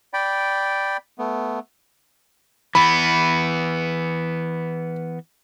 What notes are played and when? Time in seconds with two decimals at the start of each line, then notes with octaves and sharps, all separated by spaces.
0.14 D5 G5 B5
1.19 A3 B3
2.75 E3 B3 B5